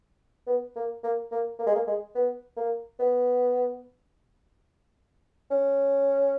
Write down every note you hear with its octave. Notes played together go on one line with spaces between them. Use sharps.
B3
A#3
A#3
A#3
A#3
G#3
A#3
G#3
B3
A#3
B3
C#4